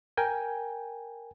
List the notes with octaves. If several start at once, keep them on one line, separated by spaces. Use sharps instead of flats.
A#4 G5 G#5